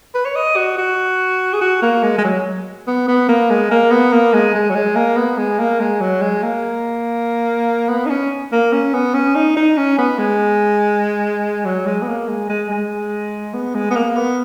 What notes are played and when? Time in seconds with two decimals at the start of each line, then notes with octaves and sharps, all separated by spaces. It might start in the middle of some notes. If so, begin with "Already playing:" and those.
0.15 B4
0.25 C#5
0.36 D#5
0.57 F#4
0.78 F#4
1.53 G#4
1.61 F#4
1.82 A#3
2.03 G#3
2.18 G#3
2.24 F#3
2.88 B3
3.08 B3
3.29 A#3
3.50 G#3
3.71 A#3
3.91 B3
4.12 A#3
4.33 G#3
4.55 G#3
4.70 F#3
4.75 G#3
4.96 A#3
5.17 B3
5.38 G#3
5.59 A#3
5.80 G#3
6.00 F#3
6.21 G#3
6.43 A#3
7.89 B3
8.06 D#4
8.10 C#4
8.52 A#3
8.73 C#4
8.94 B3
9.14 C#4
9.35 D#4
9.57 D#4
9.77 C#4
9.98 B3
10.18 G#3
11.65 F#3
11.86 G#3
12.02 B3
12.07 A#3
12.28 G#3
12.49 G#3
12.69 G#3
13.54 B3
13.75 G#3
13.91 B3
13.96 A#3
14.16 B3